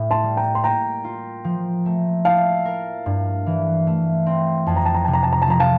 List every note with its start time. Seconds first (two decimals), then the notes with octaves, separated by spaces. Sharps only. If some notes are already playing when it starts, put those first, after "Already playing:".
Already playing: A2
0.11 A5 C6
0.23 G3
0.37 G5 A#5
0.55 C6
0.64 A#3 G5 A#5
1.04 F4
1.44 F3
1.86 A3
2.25 E4 F5 A5
2.65 A#4
3.06 G2
3.46 E3
3.87 A3
4.26 C4
4.66 F2 A5
4.76 A#5
4.85 A5
4.95 A#5
5.04 C3 A5
5.14 A#5
5.23 A5
5.33 A#5
5.42 A5
5.47 F3 A#5
5.60 F5 A5